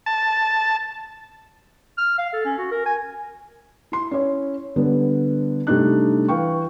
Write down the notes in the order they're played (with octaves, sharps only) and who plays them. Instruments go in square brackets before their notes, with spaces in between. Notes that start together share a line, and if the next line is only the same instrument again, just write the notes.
[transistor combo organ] A5
[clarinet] F6
F5
A4
C#4
F#4
A#4
G#5
[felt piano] E4 C6
C#4 E4 C#5
D3 G3 B3
C3 G3 A3 D4 D#4 F#6
E3 F5 G5 C#6